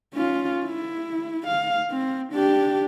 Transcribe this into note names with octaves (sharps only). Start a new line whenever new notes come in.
C#4 F4
E4
F5
C4
D4 G4